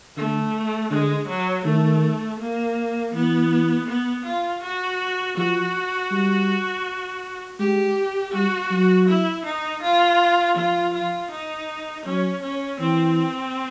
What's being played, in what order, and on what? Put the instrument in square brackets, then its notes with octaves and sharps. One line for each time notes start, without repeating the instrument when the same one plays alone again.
[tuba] D3 [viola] A3
[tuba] D3 [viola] G#3
[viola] F#3
[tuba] D#3 [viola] A3
[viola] A#3
[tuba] E3 [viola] B3
[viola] B3
F4
F#4
[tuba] F3 [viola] F#4
[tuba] G3
[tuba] G#3 [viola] G4
[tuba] G3 [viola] F#4
[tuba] F#3
[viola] E4
D#4
F4
[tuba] F3 [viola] F4
[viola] F4
D#4
[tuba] F#3 [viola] C#4
[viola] C#4
[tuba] E3 [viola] C4